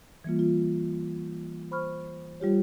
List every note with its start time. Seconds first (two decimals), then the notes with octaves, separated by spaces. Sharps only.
0.24 E3 G3 A#3 F4
0.39 F4
1.71 C5 B5 C#6 F6
2.40 G3 F4 G4 C#5